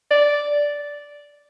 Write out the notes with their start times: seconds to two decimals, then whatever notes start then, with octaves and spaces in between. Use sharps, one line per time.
0.11 D5